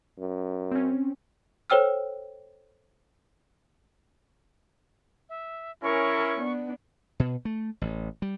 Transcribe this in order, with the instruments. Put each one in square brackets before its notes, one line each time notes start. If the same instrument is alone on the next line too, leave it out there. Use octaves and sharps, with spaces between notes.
[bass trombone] F#2
[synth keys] C4 C#4
[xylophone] A4 C5 C#5 G5 E6 F6
[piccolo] E5
[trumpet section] C#4 E4 [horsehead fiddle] A#4 [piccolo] C#6
[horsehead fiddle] B3 D4
[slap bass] B2
A3
A1
G3